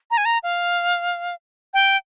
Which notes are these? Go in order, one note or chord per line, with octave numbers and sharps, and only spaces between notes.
A#5
G#5
A#5
F5
G5